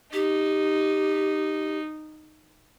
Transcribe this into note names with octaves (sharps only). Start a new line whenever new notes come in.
D#4 G4